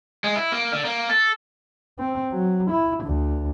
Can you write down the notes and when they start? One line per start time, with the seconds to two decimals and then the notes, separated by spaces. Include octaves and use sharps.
0.24 G#3
0.36 E4
0.52 A#3
0.72 D3
0.85 A#3
1.10 A4
1.99 C4
2.32 F#3
2.70 E4
3.04 D2